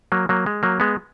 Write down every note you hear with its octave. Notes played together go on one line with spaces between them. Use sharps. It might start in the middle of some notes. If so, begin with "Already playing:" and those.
F#3 A#3
F#3 A#3
G#3
F#3 A#3
G#3 B3